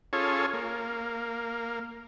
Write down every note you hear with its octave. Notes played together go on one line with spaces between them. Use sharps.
C#4 F4 G#4 A4 C#5
A#3